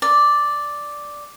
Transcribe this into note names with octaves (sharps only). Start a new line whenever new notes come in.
D5